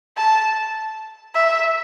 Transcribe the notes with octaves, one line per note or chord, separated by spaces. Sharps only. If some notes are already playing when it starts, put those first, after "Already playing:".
A5
E5